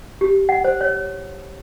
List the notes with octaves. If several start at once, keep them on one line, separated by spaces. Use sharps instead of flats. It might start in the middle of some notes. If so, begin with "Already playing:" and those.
G4
F#5
C5
C#5